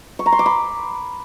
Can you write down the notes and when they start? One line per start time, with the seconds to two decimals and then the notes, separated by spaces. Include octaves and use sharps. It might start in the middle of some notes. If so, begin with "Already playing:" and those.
0.19 C#6
0.26 A#5
0.32 C6
0.39 D6
0.46 B5